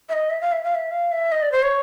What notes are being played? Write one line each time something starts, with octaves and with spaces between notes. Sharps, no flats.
E5
D#5
E5
F5
E5
F5
E5
F5
E5
D#5
D5
C5
C#5